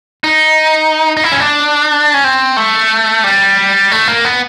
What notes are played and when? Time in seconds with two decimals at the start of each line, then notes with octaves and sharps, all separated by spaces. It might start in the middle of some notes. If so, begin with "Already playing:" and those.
0.24 D#4
1.17 D#4
1.24 E4
1.32 C#4
1.40 D4
2.14 C#4
2.24 C4
2.57 A3
3.24 G3
3.91 A3
4.08 A#3
4.25 B3